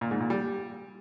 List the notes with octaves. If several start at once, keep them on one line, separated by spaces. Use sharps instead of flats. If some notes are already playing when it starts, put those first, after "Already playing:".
A#2
G#2
A#2
G3